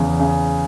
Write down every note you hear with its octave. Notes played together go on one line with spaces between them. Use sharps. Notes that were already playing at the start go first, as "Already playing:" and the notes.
Already playing: E2 C#3
C#3